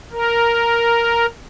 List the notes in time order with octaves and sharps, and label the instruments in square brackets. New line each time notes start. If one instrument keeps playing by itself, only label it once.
[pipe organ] A#4